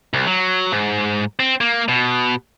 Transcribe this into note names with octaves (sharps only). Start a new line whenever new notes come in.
C2
F#3
G#2
C4
A#3
B2